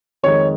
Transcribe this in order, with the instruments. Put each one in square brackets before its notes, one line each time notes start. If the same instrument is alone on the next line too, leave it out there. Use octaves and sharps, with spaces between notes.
[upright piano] F2 D#3 G#3 C#5